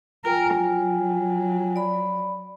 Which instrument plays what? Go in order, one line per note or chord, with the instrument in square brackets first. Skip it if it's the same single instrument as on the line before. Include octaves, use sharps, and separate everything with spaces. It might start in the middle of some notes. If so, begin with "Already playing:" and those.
[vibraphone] F4 G5 G#5 [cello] A#4
[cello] F#3
[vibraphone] D5 B5